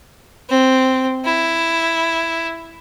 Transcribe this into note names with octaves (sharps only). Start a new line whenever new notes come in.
C4
E4